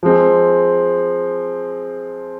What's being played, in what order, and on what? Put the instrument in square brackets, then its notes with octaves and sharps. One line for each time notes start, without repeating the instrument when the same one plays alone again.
[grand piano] F3 G#3 C4